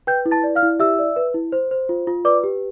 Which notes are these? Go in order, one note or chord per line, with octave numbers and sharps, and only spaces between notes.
B4 G5 G6
E4
A5 A6
D5
F5 F6
E4
G4 E5 E6
D5
B4
E4
C5
C5
F4
F4
B4 D5 D6
G4